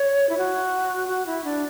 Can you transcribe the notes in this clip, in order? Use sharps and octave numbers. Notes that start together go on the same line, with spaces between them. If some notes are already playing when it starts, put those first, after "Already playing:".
Already playing: C#5
E4
F#4
F#4
E4
D4